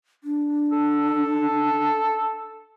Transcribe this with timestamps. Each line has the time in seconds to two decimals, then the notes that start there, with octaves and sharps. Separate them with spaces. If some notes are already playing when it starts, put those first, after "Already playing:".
0.24 D4
0.71 A4